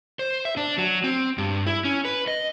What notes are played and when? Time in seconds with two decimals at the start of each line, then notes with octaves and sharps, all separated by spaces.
0.19 C5
0.45 E5
0.57 D4
0.78 F#3
1.04 C4
1.38 G2
1.66 E4
1.85 C#4
2.05 B4
2.28 D#5